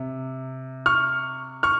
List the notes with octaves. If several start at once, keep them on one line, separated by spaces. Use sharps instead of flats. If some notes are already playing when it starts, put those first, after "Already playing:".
Already playing: C3
C#6 F6
C#6 F6